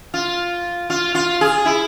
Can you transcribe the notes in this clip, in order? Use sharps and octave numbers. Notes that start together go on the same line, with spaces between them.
F4
F4
F4
G#4
E4